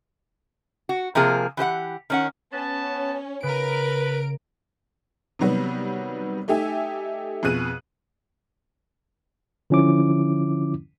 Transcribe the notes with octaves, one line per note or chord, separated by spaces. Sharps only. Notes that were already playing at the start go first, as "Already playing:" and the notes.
F#4
C3 F3 A#3 G#4
E3 G4 C5 F#5
D#3 C#4 F#5
B3 C#4 A5
C#3 A#4 B4 D7
C3 D#3 F#3 G3 B3
A3 D#4 G4 E5 G#5
F2 B2 G#4 F#6 D#7
D3 F3 C#4 E4 D6